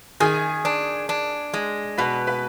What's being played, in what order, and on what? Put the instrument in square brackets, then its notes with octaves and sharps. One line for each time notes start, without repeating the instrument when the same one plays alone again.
[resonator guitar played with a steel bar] D#3 [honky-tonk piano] G#4 G#5
[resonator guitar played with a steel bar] D4
D4
G#3
[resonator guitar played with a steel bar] B2 [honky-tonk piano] B4 B5
[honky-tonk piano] B4 B5